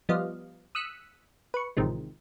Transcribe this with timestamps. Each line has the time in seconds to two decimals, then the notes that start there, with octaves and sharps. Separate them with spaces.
0.09 F3 G3 B3 D#5 F5
0.75 D#6 E6 F#6 B6 C#7
1.54 B4 C#6
1.77 A1 C3 D#3 F3 G#3